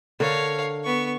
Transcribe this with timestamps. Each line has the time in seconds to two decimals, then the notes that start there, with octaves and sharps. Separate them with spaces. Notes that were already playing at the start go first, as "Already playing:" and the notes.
0.20 D3 A#4 C#5 F5
0.84 B3 C#6